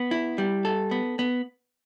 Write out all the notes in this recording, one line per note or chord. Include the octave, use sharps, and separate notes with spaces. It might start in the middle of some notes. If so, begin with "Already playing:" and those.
Already playing: B3
E4
G3
A4
B3
B3